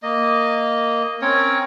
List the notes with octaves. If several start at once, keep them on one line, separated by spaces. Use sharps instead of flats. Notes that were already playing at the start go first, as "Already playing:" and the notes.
A#3 D#5
C4 C#4 A#4 C#5